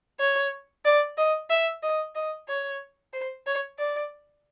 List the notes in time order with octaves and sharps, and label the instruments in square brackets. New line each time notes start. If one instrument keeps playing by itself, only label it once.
[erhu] C#5
D5
D#5
E5
D#5
D#5
C#5
C5
C#5
D5